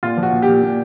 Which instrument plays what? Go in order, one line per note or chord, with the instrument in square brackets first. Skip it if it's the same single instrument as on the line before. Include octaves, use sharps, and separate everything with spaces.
[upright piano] A#2 F4
F3
F#4
A#2
G4
A#2
A#2